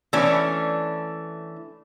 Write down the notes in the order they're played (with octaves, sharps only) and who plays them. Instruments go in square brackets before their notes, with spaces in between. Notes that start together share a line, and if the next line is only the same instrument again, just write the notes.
[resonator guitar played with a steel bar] E3 A3 C#4 D4